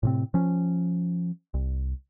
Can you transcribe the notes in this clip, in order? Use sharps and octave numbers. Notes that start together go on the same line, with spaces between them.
A2 C3 C4
F3 C#4
C2